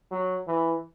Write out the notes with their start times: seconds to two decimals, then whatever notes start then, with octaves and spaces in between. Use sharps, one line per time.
0.11 F#3
0.47 E3